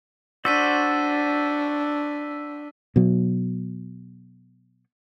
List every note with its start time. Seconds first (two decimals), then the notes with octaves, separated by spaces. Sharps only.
0.45 D4 F#4 C5 D5 E6 B6 D#7
2.96 B2 F#3